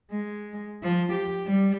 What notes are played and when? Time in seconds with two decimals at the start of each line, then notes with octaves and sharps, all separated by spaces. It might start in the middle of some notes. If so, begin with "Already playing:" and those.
0.11 G#3
0.83 F3
1.13 G4
1.47 G3